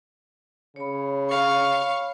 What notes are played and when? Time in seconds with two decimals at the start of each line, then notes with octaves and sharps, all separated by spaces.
0.76 C#3 C#5 B5
1.29 F5 C#6